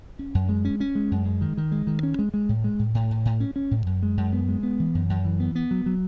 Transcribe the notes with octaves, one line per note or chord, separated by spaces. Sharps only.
C#4
F#2
G#3
C#4
C#4
G#3
F#2
G#3
D#3
D#3
G#3
D#3
C#4
G#3
G#3
A2
G#3
A2
A2
A2
A2
C#4
C#4
A2
F#2
G#3
F#2
B3
G#3
B3
E3
F#2
F#2
E3
B3
B3
F#3
F#3